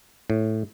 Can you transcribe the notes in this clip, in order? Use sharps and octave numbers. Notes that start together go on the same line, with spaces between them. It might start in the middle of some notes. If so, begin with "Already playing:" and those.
A2